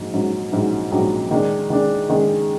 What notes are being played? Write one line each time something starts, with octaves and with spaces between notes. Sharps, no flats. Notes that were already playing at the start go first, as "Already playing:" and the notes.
Already playing: A#1 G#2 F#3
A#1 G#2 F#3
A#1 G#2 F#3
A#1 G#2 F#3
D#3 G#3 D4
D#3 G#3 D4
D#3 G#3 D4